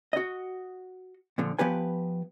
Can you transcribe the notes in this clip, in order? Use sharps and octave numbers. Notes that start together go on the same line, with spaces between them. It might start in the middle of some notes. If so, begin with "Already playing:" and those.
F#4 D#5
A#2 D3 F3
F3 B3 G4 B4 G#5